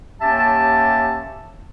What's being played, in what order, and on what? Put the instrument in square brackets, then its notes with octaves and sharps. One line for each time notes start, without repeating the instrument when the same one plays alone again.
[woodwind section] D#2 C#4 G4 E5 A5